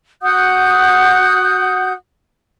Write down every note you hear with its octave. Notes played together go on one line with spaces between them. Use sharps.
F#4 F#5 D#6 G6